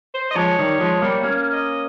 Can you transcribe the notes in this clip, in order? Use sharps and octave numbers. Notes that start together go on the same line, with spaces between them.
C5
D#5
F3 G#3 C#5
D#3 G3
F3 G#3
G3 A#3
A#3 C#4
D#5